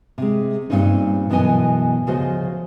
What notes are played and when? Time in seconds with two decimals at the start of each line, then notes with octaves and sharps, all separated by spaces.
0.18 C3 G#3
0.70 G2 A#2 C4 C#4 D#4
1.30 F#2 B2 E3 B3 D#5 G#5
2.06 D2 C#3 F3 F#4 C5 D#5